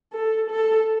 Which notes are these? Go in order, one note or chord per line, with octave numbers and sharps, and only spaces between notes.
A4
A4